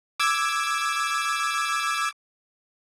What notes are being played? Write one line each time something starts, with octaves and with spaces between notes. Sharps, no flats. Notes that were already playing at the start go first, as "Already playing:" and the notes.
D6 E6 G#6